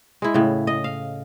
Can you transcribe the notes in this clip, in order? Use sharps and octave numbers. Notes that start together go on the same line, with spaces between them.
G#3 E4
A2 C#3
D#5
F5